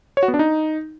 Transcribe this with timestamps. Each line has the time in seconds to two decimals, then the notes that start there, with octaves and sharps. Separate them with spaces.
0.17 C#5
0.23 F#4
0.28 B3
0.34 D4
0.39 D#4